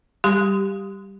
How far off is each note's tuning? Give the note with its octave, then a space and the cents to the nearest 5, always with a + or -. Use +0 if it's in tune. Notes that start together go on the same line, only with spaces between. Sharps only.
G3 +0 G4 +0 C6 -30